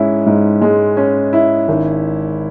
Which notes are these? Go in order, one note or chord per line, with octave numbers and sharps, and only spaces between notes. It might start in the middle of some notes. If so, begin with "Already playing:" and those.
Already playing: G#2 G#3 C#4 E4
G#2
G#3
C#4
E4
G#1